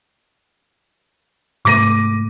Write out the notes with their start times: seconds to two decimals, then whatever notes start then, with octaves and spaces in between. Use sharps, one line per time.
1.65 G#2 C3 A3 D6 A#6 D#7